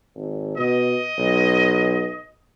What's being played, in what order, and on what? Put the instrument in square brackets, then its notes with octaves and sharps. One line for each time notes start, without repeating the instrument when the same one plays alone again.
[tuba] G#1
[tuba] B2 [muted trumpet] D#5
[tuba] B1